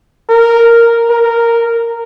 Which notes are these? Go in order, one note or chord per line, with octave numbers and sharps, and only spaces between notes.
A#4
A#4